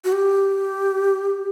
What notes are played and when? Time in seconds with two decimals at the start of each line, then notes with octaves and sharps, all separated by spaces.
0.04 F#4
0.12 G4